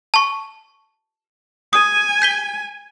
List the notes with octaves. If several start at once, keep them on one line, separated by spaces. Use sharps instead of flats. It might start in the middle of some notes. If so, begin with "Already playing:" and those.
A5 C#6
G#5 D#6
G6 B6 G7